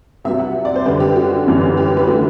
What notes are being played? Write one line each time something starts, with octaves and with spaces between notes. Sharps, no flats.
C2 C3 F#3 E5
F#5
D5
C5
F#2 D3 G3 B4
G4
F#4
G1 F#2 E3
G4
B4
D3 A3 F#4